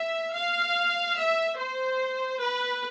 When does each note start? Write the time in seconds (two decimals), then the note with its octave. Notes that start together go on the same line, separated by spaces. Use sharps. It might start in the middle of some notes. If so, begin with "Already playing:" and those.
Already playing: E5
0.34 F5
1.17 E5
1.58 C5
2.40 B4